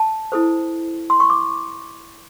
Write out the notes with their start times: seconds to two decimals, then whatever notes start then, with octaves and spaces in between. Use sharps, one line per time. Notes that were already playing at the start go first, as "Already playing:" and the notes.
Already playing: A5
0.32 E4 A4 C5
1.10 C6
1.20 C#6
1.30 D6